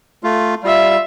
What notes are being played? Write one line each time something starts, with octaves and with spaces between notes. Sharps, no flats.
A3 F4
G3 F4 E5